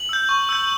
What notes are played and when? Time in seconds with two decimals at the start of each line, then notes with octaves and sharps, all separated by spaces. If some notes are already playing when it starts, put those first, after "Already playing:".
Already playing: F#7
0.09 E6 G6
0.29 C#6
0.49 E6 G6